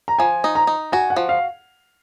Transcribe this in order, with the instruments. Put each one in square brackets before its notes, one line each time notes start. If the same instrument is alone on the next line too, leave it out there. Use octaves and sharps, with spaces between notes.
[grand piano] A#5
[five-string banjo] F3 [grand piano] G#5
[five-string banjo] D#4
[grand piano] A#5
[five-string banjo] D#4
[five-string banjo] F#4 [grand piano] G#5
[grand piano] F#5
[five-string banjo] F3
[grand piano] F5